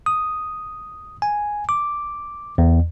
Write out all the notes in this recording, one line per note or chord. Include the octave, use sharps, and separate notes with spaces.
D#6
G#5
D6
E2